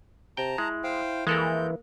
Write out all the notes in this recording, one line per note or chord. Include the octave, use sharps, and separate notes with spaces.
C3 G5 A5 A#5
G#3 E4
C5 F5 G5
F2 E3 G#3 A#3 A4 A#4 G6